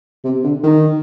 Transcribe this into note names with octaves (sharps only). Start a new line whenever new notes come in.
C3
D3
D#3